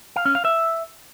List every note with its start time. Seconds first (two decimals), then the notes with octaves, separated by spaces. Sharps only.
0.16 F5
0.25 C#4
0.35 F5
0.45 E5